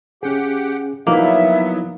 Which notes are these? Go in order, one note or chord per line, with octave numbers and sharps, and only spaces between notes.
C#4 G4 G#4 F#5 G5
F3 F#3 A#3 B3 D#4 E4 E5